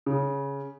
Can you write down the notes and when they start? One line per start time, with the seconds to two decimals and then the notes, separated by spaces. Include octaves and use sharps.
0.06 C#3